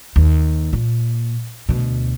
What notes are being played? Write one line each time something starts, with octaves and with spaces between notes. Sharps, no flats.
D#2
A#2
D2 B2